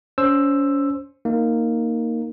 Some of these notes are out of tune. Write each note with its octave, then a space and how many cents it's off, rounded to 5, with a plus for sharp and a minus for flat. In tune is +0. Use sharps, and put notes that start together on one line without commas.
C#4 +30 C5 +10 E6 +5
A#3 -10 D#4 +0